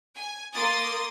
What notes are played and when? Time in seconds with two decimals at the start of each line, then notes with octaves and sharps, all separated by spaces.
0.16 G#5
0.53 A#3 C6 D#6 A6